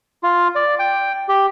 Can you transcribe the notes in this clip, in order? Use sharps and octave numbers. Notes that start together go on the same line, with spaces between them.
F4
D5
G5
G4